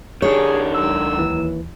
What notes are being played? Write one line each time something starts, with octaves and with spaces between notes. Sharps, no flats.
D#3 D4 D#4 G4 G#4 C#5
C#2 F#3 E6
D#2 E3 E4